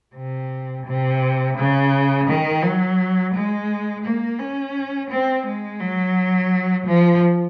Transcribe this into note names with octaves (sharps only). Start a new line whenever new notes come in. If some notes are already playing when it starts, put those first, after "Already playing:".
C3
C3
C#3
D#3
F#3
G#3
A#3
C#4
C4
G#3
F#3
F3